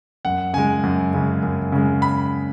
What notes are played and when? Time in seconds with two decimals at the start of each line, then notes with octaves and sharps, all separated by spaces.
0.25 F#2 F#5
0.53 C#3 G#3 G#5
0.84 F#2
1.13 C#3 G#3
1.43 F#2
1.72 C#3 G#3
2.02 B5